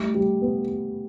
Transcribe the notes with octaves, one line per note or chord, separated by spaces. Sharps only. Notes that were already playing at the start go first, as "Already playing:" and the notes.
Already playing: G3 A3
G3
B3